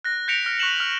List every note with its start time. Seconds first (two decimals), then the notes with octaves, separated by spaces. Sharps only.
0.04 F#6 A#6
0.28 G6 A#6 B6 C#7 D7 F7
0.43 F6 F#6 D7
0.59 C#6 F#6 B6 C#7 E7 F#7
0.80 F6